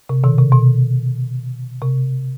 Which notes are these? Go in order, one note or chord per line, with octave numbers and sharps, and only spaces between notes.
C3
B2 D#3
C3
B2
C3